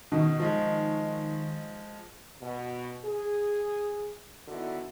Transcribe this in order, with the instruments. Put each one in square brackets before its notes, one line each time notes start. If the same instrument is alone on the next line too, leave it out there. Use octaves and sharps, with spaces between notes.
[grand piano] B2 [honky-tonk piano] D#3
[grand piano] F3 G#3
[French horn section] B2
G#4
D3 D#3 B3 E4 F#4